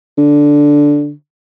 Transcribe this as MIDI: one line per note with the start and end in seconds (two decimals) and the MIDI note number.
0.18 1.12 50